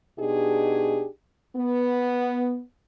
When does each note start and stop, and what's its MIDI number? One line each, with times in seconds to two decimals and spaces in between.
0.19 1.06 47
0.19 1.06 62
0.19 1.06 63
0.19 1.06 67
0.19 1.06 68
1.56 2.61 59